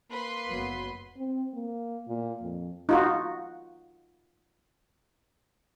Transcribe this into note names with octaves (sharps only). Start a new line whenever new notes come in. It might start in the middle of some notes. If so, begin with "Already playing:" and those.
A#3 B4 C6
F#1 F#3 B3
C4
A#3
A#2
F2
D#4 F4 F#4